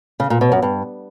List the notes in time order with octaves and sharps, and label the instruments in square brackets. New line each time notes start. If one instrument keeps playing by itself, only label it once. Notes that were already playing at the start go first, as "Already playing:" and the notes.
[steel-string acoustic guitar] C#3
A#2
B2
F#2
G2